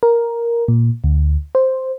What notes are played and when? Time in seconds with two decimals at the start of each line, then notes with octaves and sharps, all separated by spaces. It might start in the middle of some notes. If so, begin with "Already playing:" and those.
0.03 A#4
0.68 A#2
1.04 D2
1.55 C5